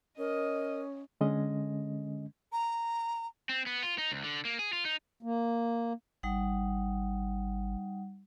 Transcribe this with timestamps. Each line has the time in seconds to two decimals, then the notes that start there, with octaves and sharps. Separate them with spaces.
0.18 C#4 A#4 D#5
1.21 D3 G#3 C#4 D#5
2.52 A#5
3.49 C4
3.67 B3
3.83 F4
3.98 D#4
4.12 C#2
4.24 D3
4.45 A#3
4.59 G#4
4.73 F4
4.85 D#4
5.23 A#3
6.23 G#1 G3 D#4 F#5